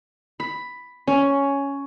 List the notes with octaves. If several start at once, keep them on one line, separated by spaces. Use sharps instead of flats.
B5
C#4